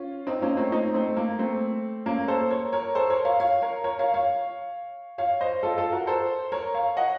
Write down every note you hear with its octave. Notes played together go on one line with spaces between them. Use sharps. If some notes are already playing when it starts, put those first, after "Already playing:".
Already playing: C#4 F4
C4 D#4
A#3 C#4
A3 C4
C4 D#4
A3 C4
A#3
A3 C4
A#3 C#4
A4 C5
A#4 C#5
A#4 C#5
A4 C5
A#4 C#5
C#5 F5
C#5 F5
A#4 C#5
A#4 C#5
C#5 F5
C#5 F5
C#5 F5
C5 D#5
F4 A4
F4 A4
F#4 A#4
A4 C5
A#4 C#5
C#5 F5
D#5 F#5